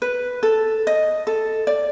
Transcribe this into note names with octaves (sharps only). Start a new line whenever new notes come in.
B4
A4
D#5
A4
D5